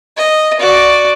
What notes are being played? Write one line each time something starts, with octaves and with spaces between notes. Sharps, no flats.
D#5
F#4 D5